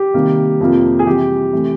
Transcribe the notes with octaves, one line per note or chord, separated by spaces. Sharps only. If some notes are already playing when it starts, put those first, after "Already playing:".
Already playing: G4
C3 D#3 G3 A#3
F2 C3 F3 A#3
G#4
C3 E3 G3 G4
C3 E3 A3